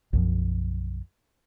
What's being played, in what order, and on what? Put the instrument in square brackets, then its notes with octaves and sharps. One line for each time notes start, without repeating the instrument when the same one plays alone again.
[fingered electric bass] B1 F#2 F3